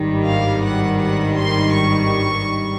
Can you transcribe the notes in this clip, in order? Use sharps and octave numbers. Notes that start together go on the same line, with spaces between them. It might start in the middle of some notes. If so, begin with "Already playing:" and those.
Already playing: G#1 G2 D#3 G3
F5
F#5
F#5
C6
C#6